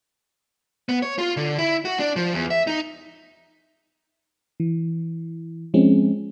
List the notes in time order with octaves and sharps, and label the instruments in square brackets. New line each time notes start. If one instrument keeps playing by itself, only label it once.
[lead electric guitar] B3
C#5
F4
D3
E4
F#4
D4
F3
E2
E5
D#4
[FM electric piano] E3
F3 G#3 C4 C#4